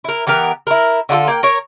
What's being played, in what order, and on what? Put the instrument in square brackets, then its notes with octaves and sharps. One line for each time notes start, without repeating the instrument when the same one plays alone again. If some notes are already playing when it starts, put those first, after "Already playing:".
[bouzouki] E4 A#4
E3 B3 G4 A#4
E4 A#4
D3 D4 F4 A4
A#3 G5
A#4 C#5